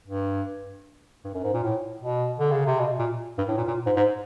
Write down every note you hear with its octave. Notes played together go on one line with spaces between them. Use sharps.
G2
G2
F#2
G#2
A#2
A2
B2
D3
C#3
C3
B2
A#2
G2
A2
A#2
A#2
G#2
G#2